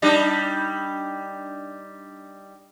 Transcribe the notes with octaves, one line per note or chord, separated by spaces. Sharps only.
G3 D4 D#4